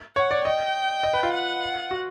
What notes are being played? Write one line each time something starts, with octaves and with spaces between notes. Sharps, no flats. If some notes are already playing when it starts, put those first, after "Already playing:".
C#5 F#5
D5
D#5 G5
D#5
B4
F4
F#5
F#4